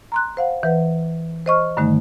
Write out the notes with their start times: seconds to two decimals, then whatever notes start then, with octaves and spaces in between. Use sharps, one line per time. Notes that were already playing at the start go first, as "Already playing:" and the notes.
0.12 A#5 C6 F#6
0.37 C5 F5 F#5
0.63 E3 B4 F#5
1.46 C5 D#5 C#6 F6
1.77 G2 D3 D#3 G3 A3 D#4